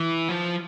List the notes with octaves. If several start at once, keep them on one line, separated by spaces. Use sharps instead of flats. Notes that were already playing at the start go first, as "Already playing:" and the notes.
Already playing: E3
F3